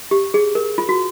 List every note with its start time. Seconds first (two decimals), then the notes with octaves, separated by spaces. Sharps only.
0.11 G4
0.34 G#4
0.55 A#4
0.78 F4
0.89 F#4